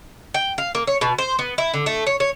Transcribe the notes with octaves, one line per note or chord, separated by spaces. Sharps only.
G5
F5
A#3
C#5
B2
C5
B3
E4
D3
A3
C#5
C#5